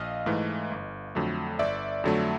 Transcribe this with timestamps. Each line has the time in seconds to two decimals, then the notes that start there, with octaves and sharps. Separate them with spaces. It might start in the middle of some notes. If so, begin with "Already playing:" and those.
Already playing: A#1 D#5 F5
0.26 G#2 E3 A3
0.72 G1
1.15 F2 D3 F#3 A3
1.59 G1 D5 E5
2.04 F2 D3 F#3 A3